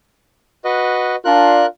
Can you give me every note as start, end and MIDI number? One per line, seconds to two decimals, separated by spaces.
0.65 1.16 66
0.65 1.16 71
0.65 1.16 75
1.25 1.65 62
1.25 1.65 65
1.25 1.66 70
1.25 1.66 90